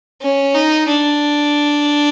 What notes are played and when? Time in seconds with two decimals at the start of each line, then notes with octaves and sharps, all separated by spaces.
0.21 C#4
0.55 D#4
0.88 D4